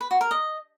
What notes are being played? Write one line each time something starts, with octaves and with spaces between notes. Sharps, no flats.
B4
F#4
A#4
D#5